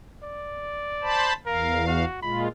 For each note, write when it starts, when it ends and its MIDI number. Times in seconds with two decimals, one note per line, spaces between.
0.23 1.31 74
1.02 1.33 72
1.02 1.33 81
1.02 1.33 83
1.46 2.05 40
1.46 1.87 70
1.46 2.05 77
1.87 2.22 66
2.22 2.48 46
2.22 2.48 56
2.22 2.48 65
2.22 2.45 83